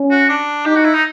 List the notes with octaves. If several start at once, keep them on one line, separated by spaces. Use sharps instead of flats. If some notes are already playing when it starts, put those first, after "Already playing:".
Already playing: C#4
F#4
D4
D#4 G4
F#4
E4
D#4